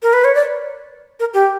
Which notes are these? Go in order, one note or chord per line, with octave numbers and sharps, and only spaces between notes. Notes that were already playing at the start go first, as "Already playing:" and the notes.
A#4
B4
C#5
D5
A#4
G4